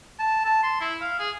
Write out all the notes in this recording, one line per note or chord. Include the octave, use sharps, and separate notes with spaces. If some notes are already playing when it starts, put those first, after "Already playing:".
A5
A5
C6
E4
F5
G#4